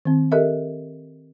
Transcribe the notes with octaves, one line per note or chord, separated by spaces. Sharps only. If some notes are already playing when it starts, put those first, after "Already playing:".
D#3 C4
G4 A4 A#4 D#5 E5